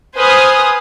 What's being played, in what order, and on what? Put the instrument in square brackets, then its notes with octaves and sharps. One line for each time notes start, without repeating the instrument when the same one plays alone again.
[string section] B4 C5 G#5 D#6 F6